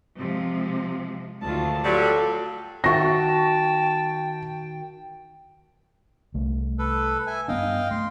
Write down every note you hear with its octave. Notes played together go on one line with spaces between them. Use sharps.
C3 F3 G#3
D2 D#3 F4 A5
F#3 G3 F4 A4
D#3 F#4 E5 G5 A5 C#6 A#6
C2 A3
A4 B4
E5 G#5
G2 B3 D4 D#5 F5 G5
A3 C6